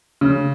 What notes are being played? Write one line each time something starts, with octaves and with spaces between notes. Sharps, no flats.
C#3